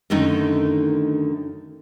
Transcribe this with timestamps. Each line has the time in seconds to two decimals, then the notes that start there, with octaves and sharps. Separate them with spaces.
0.10 F#2 D3 D#3 A3 D#4